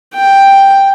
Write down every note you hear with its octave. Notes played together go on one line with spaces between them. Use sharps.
G5